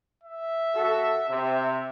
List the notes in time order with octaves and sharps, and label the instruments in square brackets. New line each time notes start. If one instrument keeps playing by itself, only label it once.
[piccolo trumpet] E5
[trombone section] D#2 F#4 A4
[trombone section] C3 [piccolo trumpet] E5